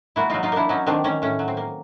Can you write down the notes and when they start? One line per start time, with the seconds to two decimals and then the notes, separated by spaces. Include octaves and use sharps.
0.16 A#3 E4 F#4
0.30 F#3 D#4 F4
0.43 D#4 F4
0.52 A#3 D4 E4
0.69 F#3 C#4 D#4
0.87 D#3 C4 D4
1.04 D#3 C#4
1.22 A2 C#4
1.39 F#3
1.48 C4
1.57 A#3